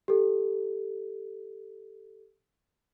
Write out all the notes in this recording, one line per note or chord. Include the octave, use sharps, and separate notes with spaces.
G4 A4